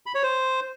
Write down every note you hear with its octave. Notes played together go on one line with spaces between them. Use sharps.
B5
C#5
C5